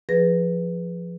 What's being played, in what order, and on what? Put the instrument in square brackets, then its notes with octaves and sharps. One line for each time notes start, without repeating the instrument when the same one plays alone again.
[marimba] F3 G#4 B4 A#6